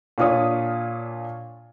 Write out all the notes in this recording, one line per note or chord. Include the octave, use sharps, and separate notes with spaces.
A#2 D4 F4 C#5 D#6